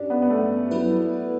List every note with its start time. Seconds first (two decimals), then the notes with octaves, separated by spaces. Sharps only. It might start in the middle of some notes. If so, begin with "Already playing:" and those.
Already playing: G2 C#4 D4 G4
0.10 B3
0.22 B3
0.30 A3
0.71 F#3 B3 E4 B4